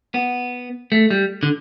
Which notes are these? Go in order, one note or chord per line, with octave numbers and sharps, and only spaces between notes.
B3
A3
G3
D3